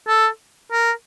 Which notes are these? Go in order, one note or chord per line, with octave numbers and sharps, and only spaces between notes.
A4
A#4